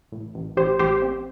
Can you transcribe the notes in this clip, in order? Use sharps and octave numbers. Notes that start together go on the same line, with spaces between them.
A1
A1
A1 G4 C5
A1 G4 C5
C4